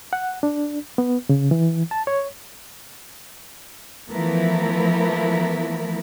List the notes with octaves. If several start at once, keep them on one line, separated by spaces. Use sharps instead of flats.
F#5
D4
B3
C#3
E3
A5
C#5
E3 F3 A3 B3 E4 A#4